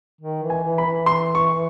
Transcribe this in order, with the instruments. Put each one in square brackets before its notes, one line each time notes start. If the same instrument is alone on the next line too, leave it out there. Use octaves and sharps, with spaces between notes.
[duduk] D#3
E3
[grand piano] G#5
[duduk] E3
[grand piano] B5
[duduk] E3
[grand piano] C6
C#6